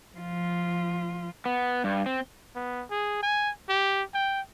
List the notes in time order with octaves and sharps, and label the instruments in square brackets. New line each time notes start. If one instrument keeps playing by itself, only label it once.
[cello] F3 F4
[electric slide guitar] B3
G2
C4
[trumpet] B3
G#4
G#5
G4
G5